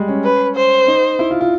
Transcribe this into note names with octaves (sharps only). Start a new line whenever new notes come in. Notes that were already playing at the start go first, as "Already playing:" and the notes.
Already playing: G3 G#3
C#4
B4
C5
D#4
E4
F4
F4